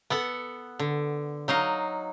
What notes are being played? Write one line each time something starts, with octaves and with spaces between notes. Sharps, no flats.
B3 A4 F#5
D3
F#3 D#4 D#5 F5